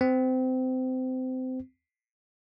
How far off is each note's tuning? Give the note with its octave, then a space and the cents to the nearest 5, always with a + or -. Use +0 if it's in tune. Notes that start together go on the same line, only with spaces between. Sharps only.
C4 -25